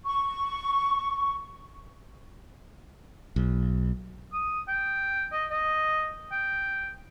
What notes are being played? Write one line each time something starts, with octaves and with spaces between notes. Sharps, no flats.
C#6
B1
D#6
G5
D#5
D#5
G5